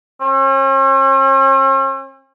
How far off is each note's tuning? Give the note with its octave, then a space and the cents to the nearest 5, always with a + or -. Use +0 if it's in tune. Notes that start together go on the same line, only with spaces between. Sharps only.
C#4 -45